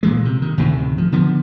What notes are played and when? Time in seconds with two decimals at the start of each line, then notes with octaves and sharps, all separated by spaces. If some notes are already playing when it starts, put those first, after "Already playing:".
0.03 A#2 E3 G#3
0.25 C3
0.42 D#3
0.58 D2 A2 C3 D#3
0.98 F3
1.12 D3 F3 B3